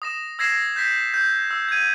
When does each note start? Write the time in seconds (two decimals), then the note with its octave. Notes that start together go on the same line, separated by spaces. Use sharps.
0.02 D#6 A#6 E7
0.39 E6 G#6 A#6 C7 E7
0.76 G6 A#6 B6
1.14 G6
1.51 E6
1.69 G#6 D#7